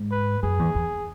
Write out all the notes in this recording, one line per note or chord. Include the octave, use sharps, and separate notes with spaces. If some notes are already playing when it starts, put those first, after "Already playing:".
Already playing: G#2
B4
F#2 G#4
E2
E2